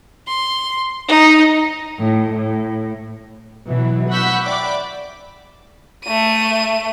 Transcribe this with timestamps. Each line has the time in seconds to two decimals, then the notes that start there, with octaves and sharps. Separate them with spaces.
0.27 C6
1.08 D#4
2.00 A2
2.35 A2
3.67 B2 E3 F#3
4.10 F#5 B5 C#6 E6 G6 B6
4.43 D5 E5 G5 B5 D6
6.05 A3 D#7